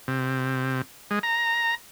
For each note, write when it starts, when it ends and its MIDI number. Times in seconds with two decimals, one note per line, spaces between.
0.08 0.82 48
1.11 1.19 56
1.23 1.75 82